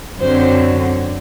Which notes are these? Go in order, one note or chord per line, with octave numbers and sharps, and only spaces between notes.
F#2 D3 F#3 C4 C5